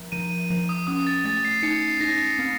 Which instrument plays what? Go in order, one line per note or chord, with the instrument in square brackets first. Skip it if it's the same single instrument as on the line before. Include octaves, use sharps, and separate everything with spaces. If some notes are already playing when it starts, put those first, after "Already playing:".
Already playing: [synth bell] F3
[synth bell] F3 [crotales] D#7
[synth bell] F3
[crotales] D#6
[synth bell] C#4 [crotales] D#6
[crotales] A6
[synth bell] A3 [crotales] A6
[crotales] C7
[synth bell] D#4 [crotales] C#7
[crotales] C7
[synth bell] D#4 [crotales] A#6
[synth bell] C4